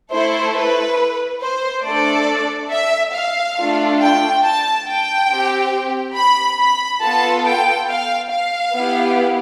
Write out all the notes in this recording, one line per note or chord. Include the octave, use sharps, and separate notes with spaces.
A3 E4 A4 C5
B4
C5
A3 D4 A4 D5
E5
F5
A3 D4 F4 A4
G5
A5
G5
C4 G4
B5
B5
B3 F4 A4 A5
G5
F5
F5
B3 E4 G4